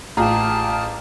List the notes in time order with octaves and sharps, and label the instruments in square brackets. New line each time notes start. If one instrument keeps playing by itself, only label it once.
[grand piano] A1 [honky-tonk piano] F4 G#4 [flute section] G4 A5 D#6 [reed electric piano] A#5